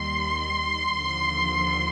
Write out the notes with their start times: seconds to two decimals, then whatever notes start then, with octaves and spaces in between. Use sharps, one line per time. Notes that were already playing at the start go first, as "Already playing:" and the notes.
Already playing: D#2 D#3 G3 C6
1.00 D#2 D3 F3